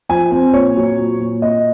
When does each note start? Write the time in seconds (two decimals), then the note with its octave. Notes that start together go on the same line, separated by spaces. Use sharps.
0.09 F3 G#5
0.31 C4
0.53 A#2 C#5
0.76 F#3
0.98 A#2
1.20 A#2
1.42 A#2 D#5